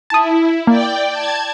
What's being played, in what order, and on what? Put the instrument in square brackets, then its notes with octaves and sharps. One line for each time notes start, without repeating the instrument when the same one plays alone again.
[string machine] E4 [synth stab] A5 D#6
[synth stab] A#3 [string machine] D5 G5
[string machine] A5 G#6